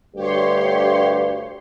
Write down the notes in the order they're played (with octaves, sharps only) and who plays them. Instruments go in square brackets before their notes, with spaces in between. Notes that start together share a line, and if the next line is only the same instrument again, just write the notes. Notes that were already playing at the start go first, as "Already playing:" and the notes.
[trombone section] D2 G2 [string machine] G4 C#5 C6